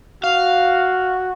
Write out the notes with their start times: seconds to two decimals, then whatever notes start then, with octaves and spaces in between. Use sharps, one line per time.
0.24 F#4 F5